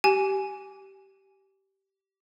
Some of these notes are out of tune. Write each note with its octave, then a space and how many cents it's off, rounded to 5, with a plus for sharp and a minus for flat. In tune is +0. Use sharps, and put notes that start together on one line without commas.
G4 -20 G#5 +0